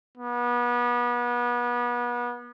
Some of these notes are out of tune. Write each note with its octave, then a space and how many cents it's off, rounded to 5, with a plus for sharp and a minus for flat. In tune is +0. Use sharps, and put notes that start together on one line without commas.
B3 -30